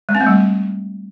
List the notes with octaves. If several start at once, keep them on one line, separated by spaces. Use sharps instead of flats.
G#3
C4
A3
G3